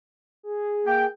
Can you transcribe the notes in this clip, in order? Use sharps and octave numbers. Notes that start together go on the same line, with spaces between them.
G#4
A#3 G5